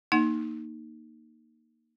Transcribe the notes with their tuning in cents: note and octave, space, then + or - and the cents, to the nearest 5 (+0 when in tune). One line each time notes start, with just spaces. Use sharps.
A#3 +0 D#4 -10 F#5 +0